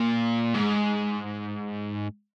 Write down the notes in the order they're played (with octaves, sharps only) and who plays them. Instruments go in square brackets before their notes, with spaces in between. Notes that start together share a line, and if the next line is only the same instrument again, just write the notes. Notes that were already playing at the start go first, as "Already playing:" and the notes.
Already playing: [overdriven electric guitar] A#2
G#2